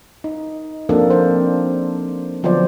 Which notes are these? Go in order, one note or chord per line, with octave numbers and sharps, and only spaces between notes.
D#4
F3 A#3 C4 D4 A4 A#4
C4 D4 C5
D3 F3 F#3 B3 C5 D5